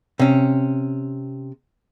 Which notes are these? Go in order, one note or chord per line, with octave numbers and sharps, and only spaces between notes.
C3 C#4